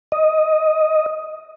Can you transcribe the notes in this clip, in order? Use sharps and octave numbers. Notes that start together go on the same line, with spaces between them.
D#5